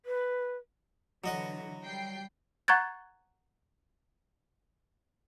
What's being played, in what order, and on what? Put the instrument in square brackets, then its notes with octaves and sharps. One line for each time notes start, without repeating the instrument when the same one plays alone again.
[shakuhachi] B4
[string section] D3 E3 [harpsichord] F#3 D#5 F#5
[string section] G3 G5 C7
[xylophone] F#5 A#5 C#6 F#6 G#6 A6